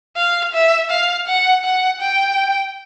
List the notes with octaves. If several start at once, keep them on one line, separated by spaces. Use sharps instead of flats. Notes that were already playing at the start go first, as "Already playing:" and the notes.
F5
E5
F5
F#5
F#5
G5